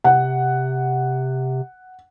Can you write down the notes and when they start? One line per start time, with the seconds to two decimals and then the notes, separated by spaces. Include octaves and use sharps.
0.04 C3 F#5